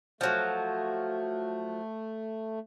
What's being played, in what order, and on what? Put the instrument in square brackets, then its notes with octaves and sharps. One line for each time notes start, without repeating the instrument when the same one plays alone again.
[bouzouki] F3 F#3 [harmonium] A3